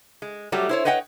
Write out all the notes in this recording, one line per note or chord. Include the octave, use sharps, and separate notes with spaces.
G#3
F#3 G3 A3 G4
E4 C5 C#5
B4 C#5 D#5 F#5 G5